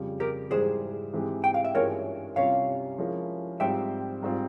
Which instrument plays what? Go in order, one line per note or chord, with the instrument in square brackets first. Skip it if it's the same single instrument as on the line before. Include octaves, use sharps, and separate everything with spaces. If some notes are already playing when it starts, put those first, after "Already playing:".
Already playing: [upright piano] F2 C#3 G3
[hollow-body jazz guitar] G4 A#4
[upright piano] G#2 E3 G3 [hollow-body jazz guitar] G#4 C5
[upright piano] G#2 E3 G#3 C4 G4
[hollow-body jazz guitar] G5
F5
E5
[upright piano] G2 E3 G#3 C#4 F4 [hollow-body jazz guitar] A#4 C#5
[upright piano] C2 C3 G3 C#4 F4 [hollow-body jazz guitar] C#5 F5
[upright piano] F3 G#3 C#4 E4 A#4
[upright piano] G#2 G3 C4 F4 C5 [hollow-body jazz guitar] E5 G5
[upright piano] G#2 G3 C4 F4